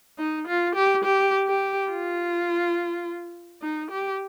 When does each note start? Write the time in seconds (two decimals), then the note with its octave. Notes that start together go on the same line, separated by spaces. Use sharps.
0.18 D#4
0.47 F4
0.75 G4
1.04 G4
1.47 G4
1.90 F4
3.62 D#4
3.91 G4